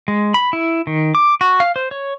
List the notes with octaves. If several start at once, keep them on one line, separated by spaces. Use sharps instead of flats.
G#3
B5
E4
D#3
D6
F#4
F5
C5
C#5